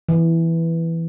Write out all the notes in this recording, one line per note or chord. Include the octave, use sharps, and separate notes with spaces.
E3